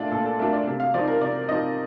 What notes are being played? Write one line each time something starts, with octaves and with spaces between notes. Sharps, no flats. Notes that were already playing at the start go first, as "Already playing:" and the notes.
Already playing: A#2 A3 D4 F4 D5
A#2 A4
A4
A3 D4 F4 A#4
D5
C3
F5
F3 C4 D#4 D5
A#4
C3 D5
F3 C4 D#4 D#5